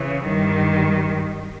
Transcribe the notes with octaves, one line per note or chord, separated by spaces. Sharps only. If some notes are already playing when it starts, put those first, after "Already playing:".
Already playing: C#3 E3
G2 D#3 G3